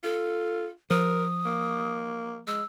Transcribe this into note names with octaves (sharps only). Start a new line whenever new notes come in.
F4 A4
F3 A#4 D#6
A#3
G#3 E6